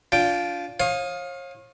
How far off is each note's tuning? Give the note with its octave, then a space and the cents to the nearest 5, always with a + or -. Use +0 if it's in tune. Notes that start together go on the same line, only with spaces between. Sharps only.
D4 -30 F4 +5 G5 +0
C#5 -40 F5 +15 D#6 +0